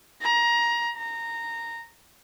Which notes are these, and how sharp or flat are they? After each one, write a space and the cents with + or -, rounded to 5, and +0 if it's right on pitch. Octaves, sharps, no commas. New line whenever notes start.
A#5 +20
A#5 -15